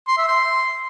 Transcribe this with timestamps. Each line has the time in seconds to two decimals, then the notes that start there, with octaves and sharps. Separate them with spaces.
0.08 C6
0.18 E5
0.28 C6